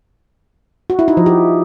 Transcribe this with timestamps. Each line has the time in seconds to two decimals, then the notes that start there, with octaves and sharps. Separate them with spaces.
0.90 F#4
0.99 E4
1.08 D#4
1.17 F3
1.26 G4